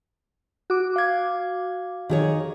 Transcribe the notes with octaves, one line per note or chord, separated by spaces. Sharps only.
F#4 D6
F5 G#6
D#3 G#4 C#5